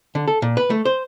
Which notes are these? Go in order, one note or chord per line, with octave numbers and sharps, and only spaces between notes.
D3
A4
A#2
B4
A3
C5